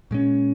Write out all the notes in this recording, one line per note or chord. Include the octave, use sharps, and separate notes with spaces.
A#2 G#3 C#4